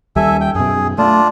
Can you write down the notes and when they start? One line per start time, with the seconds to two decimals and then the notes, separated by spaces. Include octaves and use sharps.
0.16 D#2 G3 A4 E5 G#5
0.41 G5
0.55 F#2 B2 G#4
0.98 A3 D4 F4 D5